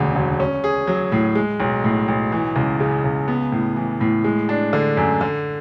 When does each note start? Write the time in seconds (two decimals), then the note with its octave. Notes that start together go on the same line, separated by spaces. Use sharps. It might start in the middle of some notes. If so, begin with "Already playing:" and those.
Already playing: E1 D2 C#3
0.15 E1
0.40 C#4
0.64 G#4
0.87 F#3
1.12 A2
1.35 G#3
1.60 B1
1.84 A2
2.08 B1
2.32 E3
2.56 C#2
2.80 C#3
3.04 C#2
3.28 B3
3.52 A2
3.76 E3
4.01 A2
4.24 G#3
4.49 D4
4.73 D3
4.97 F#2
5.21 D3